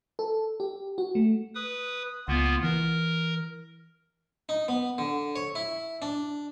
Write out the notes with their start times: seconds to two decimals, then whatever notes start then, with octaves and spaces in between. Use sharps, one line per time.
0.19 A4
0.60 G4
0.98 F#4
1.15 A3
1.55 B4 D#6
2.28 C#2 A#3 B3 F4
2.63 E3 A#4
4.49 D#4
4.68 B3
4.98 D3
5.36 C#5
5.55 E4
6.02 D4